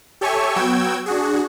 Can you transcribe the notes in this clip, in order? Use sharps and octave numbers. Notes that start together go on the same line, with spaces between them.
G4 A4 C#5 E5 G#5 C#6
F#3 B3 F#4 G5 E6 G#6
D4 F#4 G#4